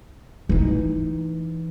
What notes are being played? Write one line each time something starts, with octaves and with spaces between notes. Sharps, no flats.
E3 D#4